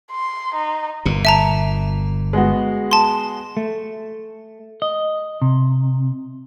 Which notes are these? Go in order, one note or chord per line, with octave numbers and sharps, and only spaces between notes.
C6
D#4
G1 A#2
E5 A5 A#5
G#3 B3 F#4
A5 C6
A3
D#5
C3